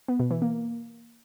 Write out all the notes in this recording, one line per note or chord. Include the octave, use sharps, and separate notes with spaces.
B3
B2
E3
A#3